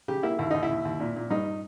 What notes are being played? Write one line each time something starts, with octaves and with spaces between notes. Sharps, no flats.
C#3 G4
A#3 E4
D#2 E4
D#2 D#4
E4
D#2
D#2
A#2
A#2
G2 D#4